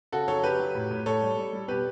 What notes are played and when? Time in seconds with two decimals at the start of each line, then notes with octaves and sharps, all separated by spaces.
0.12 C#3 F#4 A4
0.28 F#3 A4 C#5
0.43 F#3 G4 B4
0.59 F#3
0.75 A2
0.91 A2
1.06 A2 A4 C#5
1.22 G3
1.37 G3
1.53 G3
1.68 B2 G4 B4